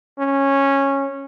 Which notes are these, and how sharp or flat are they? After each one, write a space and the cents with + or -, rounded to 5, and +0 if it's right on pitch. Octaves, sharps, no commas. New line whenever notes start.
C#4 -10